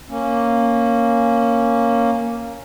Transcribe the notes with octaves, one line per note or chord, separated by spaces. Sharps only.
A#3 C#4